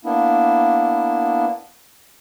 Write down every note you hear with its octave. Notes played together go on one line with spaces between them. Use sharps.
A#3 B3 D4 E4